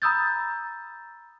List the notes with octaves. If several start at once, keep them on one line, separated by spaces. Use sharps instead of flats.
A#5 B5 D#6 E6 G6 A6